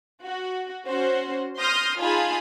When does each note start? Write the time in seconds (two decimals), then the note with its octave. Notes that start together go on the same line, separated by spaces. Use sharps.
0.24 F#4
0.87 C#4 F#4 C5
1.58 C6 D#6 F6 G6 A#6
2.01 D#4 F4 G#4 G#5 A5 B5